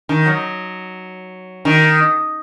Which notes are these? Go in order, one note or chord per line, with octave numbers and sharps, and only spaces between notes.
D#3
F#3
D#3